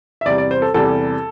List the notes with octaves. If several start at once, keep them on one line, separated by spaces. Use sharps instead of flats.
E5
E2 C3 G3 D5
D5
C5
A4
E2 C3 G3 A4